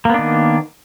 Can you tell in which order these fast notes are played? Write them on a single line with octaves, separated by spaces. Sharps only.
A#3 B3 D4 D#3